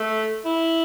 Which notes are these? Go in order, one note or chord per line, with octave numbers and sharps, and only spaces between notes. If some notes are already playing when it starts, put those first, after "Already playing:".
Already playing: A3
E4